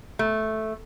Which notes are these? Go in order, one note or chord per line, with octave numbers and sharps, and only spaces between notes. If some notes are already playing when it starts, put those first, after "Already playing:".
A3